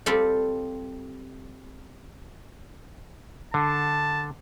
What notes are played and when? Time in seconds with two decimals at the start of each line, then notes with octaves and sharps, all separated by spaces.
0.06 G3 C4 F4 G4 A4
3.54 D3 A5